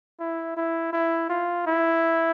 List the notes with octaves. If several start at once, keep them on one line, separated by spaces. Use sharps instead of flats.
E4
E4
E4
F4
E4